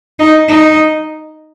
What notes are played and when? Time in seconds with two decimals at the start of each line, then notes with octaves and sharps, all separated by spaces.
0.19 D#4
0.49 D#4